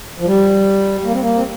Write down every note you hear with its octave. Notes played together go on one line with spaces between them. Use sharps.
F3
G3
A#3
C4
A#3
C4